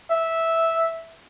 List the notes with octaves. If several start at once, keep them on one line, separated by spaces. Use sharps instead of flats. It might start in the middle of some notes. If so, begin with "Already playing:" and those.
E5